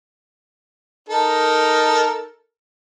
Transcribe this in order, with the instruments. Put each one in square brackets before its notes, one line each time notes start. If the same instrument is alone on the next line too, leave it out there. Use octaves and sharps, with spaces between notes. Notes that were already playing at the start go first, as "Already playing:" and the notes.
[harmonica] D#4 A4 A#4